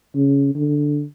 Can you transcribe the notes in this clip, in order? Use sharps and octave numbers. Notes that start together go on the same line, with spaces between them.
C#3
D3